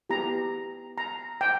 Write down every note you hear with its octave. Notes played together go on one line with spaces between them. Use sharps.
B3 E4 G4 A#5
A#5
G5